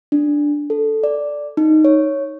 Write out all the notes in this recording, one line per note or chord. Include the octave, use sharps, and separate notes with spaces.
D4
A4
D5
D#4
C#5